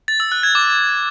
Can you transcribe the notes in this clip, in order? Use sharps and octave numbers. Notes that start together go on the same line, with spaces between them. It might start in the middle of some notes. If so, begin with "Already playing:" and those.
A6
E6
F#6
G#6
D6